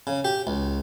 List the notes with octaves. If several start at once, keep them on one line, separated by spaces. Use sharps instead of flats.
C#3
G4
C#2